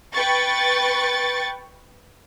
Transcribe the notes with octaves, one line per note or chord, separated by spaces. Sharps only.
B4 G5 C#6 A6